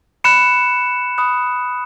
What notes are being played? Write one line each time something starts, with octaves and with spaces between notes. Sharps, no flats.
B5 F#6 C#7 E7
B5 D#6 F#6